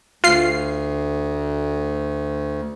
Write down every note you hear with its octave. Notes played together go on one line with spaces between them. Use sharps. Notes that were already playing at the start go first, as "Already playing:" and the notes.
D2 F4 C7